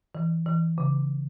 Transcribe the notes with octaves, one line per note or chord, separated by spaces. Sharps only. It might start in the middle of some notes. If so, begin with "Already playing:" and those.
E3
E3
C#3